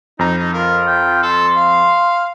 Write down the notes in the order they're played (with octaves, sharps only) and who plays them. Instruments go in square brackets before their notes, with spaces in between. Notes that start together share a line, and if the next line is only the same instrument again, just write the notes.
[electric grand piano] F2 A#5 [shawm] D#4
[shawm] D#4
[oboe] F4 [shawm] A#4
[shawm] G5
[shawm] A4 [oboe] C6
[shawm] F5